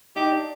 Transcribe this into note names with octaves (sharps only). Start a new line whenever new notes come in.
D#4 G4
D4